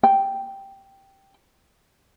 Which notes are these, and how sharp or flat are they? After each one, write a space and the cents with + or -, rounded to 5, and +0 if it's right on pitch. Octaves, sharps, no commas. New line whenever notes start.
G5 -5